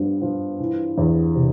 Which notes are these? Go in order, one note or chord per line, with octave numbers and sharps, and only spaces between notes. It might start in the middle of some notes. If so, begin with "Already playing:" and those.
Already playing: G2 F3 B3
F3
E3
E2
C3